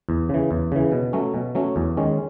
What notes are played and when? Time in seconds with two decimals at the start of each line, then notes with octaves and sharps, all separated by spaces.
0.09 E2
0.29 C#3 E3
0.51 E2
0.72 C#3 E3
0.92 B2
1.13 F#3 A3 C#4
1.34 B2
1.55 F#3 A3 C#4
1.76 E2
1.97 D#3 G#3 C#4